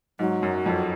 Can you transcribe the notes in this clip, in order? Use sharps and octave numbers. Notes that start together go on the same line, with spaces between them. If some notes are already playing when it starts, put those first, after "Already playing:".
G#2 F#3
F#2
F2